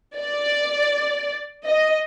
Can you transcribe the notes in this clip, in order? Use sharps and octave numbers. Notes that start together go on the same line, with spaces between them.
D5
D#5